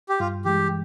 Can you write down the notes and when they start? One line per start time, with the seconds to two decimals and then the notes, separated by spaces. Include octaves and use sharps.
0.09 G4
0.20 G2 F4
0.45 E3 G#3 G4